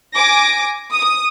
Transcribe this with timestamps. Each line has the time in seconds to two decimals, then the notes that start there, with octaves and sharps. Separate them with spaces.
0.15 G#5 D6 A#6
0.92 D#6